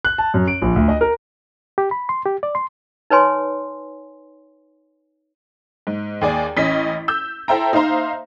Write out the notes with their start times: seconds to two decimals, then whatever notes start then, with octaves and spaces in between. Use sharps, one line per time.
0.05 F#6
0.18 A5
0.34 F#2
0.48 D7
0.62 A#1
0.76 D2
0.88 D#5
1.01 A#4
1.78 G4
1.91 B5
2.09 C6
2.25 G4
2.43 D5
2.55 C6
3.10 D#4 B4 C#5 G#5 C6
5.87 G#2
6.21 D#2 G#4 D5
6.57 A1 C#4 D#5 B6
7.08 E6 G6
7.48 E4 A4 C5 E5 G5 A#5
7.73 D#4 C5 E5 F5 A#5 C6